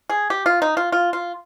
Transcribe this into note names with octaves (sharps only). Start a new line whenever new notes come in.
G#4
G4
F4
D#4
F4
F4
F4